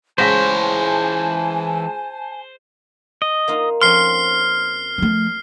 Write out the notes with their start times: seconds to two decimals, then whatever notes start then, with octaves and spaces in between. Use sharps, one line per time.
0.18 C#2 E3 C5 C#5 G#5 A5 A#6 B6
3.22 D#5
3.48 A#3 D#4 F4
3.81 F2 F3 C#4 C6 F6 C7
4.98 F3 A3